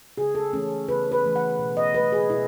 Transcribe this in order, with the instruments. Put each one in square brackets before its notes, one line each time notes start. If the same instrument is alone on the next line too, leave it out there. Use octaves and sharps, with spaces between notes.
[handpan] C#3 G#4
A4
E3 A3 C#4
C#3 B4
B4
E3 A3
F#5
B2
D#5
F#3 A3 B4
G#4
B2 E4